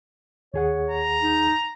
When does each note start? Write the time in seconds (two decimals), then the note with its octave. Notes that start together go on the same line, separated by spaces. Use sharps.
0.54 D#2 G#4 C#5 F#5
0.90 A#5
1.22 D#4